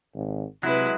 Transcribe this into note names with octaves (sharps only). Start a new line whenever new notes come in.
G#1
C3 F#3 G#3 E4 B4